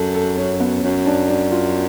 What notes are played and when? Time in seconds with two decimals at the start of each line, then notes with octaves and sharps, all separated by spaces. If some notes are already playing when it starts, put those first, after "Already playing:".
Already playing: F#2 A4
0.15 A4
0.37 C#4
0.60 B3
0.83 F#2 C#4
1.06 D4
1.28 D4
1.51 F4